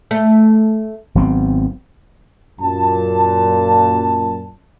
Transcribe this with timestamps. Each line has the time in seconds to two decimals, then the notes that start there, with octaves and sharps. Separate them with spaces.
0.11 A3
1.15 G#1 F#3 B3 C4
2.60 F#2 A#2 A5